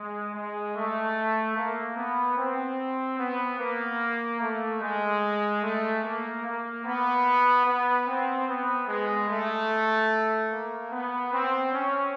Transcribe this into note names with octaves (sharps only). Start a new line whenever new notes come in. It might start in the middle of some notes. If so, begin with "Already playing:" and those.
Already playing: G#3
G#3
A3
A#3
B3
C4
B3
A#3
A3
G#3
A3
A#3
A#3
B3
B3
C4
B3
G#3
A3
A#3
B3
C4
C#4